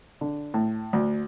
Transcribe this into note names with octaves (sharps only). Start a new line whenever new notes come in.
D3
A2
D2